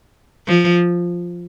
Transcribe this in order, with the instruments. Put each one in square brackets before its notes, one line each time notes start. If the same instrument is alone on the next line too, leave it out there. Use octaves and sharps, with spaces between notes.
[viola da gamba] F3